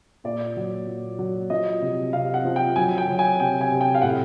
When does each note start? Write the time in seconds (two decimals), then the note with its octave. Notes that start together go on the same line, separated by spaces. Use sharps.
0.24 A#2 D5
0.57 F#3
0.87 A#2
1.19 F#3
1.50 F3 D#5
1.82 C3
2.13 C3 F5
2.34 F#5
2.45 F3
2.56 G5
2.76 F#3 G#5
2.98 G5
3.08 F#3
3.19 G#5
3.40 C3 G5
3.61 G#5
3.71 C3
3.81 G5
3.95 F5
4.02 A2 F#5